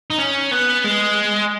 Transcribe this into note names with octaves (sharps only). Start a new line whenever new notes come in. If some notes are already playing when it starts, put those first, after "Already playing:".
D#4
C#4
B3
G#3